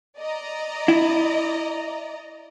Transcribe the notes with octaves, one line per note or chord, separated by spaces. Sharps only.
D5 D#5 A#5
E4